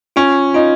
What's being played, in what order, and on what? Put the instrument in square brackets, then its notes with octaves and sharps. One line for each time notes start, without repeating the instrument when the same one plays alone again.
[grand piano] C#4 [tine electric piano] F4
[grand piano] D#4 [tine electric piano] F4